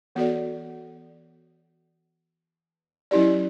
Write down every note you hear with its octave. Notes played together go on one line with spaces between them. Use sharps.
E3 B3 F#4 A4 D5
F#3 C#4 E4 G4 D5